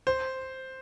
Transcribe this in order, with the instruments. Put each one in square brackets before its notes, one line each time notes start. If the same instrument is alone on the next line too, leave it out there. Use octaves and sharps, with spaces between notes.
[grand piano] C5